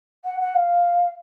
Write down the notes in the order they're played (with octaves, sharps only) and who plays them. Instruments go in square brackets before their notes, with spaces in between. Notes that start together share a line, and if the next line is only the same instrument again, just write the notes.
[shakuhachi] F#5
F#5
F5